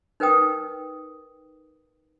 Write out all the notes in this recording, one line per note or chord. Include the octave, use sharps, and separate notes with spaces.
D#4 A#4 B4 G5 D#6